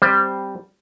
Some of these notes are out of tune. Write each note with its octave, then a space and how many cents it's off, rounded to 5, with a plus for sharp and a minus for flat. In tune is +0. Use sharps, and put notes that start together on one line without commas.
G3 +0 C4 +0 C5 +0